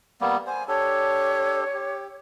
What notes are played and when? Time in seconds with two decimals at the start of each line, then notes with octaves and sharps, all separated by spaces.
0.21 G3 A#3 B3
0.47 C5 G#5
0.68 D4 G4 A4 C#5
1.74 G4